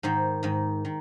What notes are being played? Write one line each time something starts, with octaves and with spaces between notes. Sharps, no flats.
G#2 D#3 C5
G#2 D#3
D#3